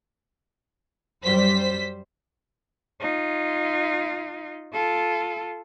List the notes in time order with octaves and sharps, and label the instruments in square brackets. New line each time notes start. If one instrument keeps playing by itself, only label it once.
[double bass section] F#2 G3 [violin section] C5 B6
[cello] D#4 F4
F4 A4